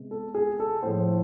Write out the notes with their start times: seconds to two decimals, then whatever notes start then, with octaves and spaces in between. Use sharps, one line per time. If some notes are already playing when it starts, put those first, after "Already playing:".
Already playing: C3 G#3 B3
0.11 A4
0.35 G#4
0.60 A4
0.83 A2 F3 A3 C5